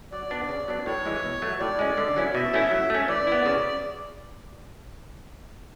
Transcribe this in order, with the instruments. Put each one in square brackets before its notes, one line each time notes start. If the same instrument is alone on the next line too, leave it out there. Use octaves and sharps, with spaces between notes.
[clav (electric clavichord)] F#3 [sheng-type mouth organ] D5
[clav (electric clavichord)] B3 D4
C#3
F#3 B3 D4
[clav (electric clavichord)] A2 [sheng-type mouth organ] C#5
[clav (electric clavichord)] E3 G#3
B2
F#3 A3
[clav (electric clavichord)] A2 [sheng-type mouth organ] D5
[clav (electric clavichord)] G#3 C#4
D3
F#3 C#4 E4
[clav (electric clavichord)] B2 [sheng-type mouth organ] E5
[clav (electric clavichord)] A3 C#4 E4
F#3
A3 C#4
[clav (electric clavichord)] E3 [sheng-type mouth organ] D5
[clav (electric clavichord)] B3 E4
C#3